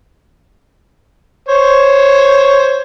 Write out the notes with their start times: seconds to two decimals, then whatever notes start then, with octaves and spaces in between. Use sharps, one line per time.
1.49 C5 C#5